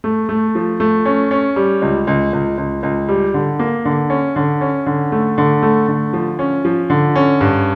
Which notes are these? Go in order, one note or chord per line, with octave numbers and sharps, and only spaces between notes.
A3
A3
F3
A3
C#4
C#4
G3
C#2
C#2
C#2
C#2
C#2
G3
D3
A#3
D3
C#4
D3
C#4
D3
A3
D3
A3
D3
F3
C#4
F3
D3
C#4
G2